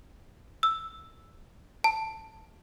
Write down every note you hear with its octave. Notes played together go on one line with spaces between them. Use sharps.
E6
A5